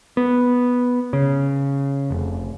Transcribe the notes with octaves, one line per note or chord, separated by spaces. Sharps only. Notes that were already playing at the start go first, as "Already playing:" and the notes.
B3
C#3
F1